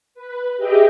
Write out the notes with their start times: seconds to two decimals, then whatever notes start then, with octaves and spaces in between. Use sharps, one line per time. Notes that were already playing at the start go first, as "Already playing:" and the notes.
0.14 B4
0.57 G4 G#4 D#5 E5 G5